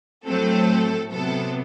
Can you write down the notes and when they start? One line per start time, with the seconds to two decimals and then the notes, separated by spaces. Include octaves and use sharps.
0.26 A2 F#3 A3 C4 A4
1.12 C3 F#3 B3 A4